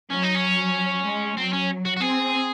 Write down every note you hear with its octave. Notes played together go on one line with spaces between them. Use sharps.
F#3 C#4
D#4
C#4
G#3
F#3 C4
C#4
F#4
F#4
C4 G#4